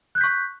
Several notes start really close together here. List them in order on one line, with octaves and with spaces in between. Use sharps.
F#6 G6 B6 C#6